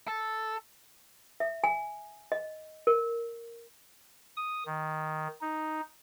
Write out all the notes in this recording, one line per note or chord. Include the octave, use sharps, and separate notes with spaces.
A4
E5
G#5
D#5
A#4
D#6
D#3
D#4